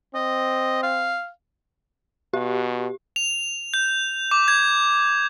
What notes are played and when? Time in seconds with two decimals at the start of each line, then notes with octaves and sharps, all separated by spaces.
0.15 C4 D#5
0.83 F5
2.34 B2 G4
3.16 F7
3.74 G6
4.31 D6
4.48 G#6